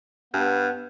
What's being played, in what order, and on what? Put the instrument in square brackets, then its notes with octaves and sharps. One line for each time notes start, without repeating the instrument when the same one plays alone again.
[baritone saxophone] G2 [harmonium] B3